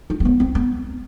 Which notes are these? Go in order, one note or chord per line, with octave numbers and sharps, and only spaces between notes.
D#4
C4
B3
C4
B3